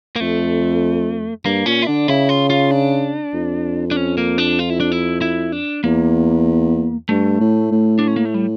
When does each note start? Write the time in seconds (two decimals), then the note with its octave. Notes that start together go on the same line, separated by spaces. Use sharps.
0.16 A#3
0.20 F2 A3
1.45 G2 A#3
1.66 A#2 C#4
1.82 E4
1.87 D3 D4
2.08 C#3 E4
2.29 F4
2.50 F4
2.71 D4
3.34 F2
3.91 D4
3.97 C#4
4.18 A#3
4.38 D4
4.59 F4
4.70 E4
4.80 D4
4.92 E4
5.22 E4
5.52 D4
5.84 E2 A#3
7.09 G2 A3
7.40 A2
7.72 A2
7.99 D4
8.07 C#4
8.16 A#3
8.25 A3
8.34 G3